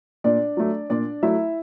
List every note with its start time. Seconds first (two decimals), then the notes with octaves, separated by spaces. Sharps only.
0.24 A#2 D4 D5
0.57 F#3 A3
0.90 A#2 D4 D5
1.23 F#3 A3 E4 E5